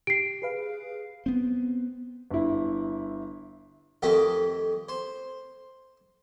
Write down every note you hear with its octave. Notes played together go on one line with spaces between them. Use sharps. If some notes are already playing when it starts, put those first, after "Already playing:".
G4 C7 D7
G#4 B4 F5
B3 C4
G1 E4
F2 D#3 A3 G4 D#5 G5
C5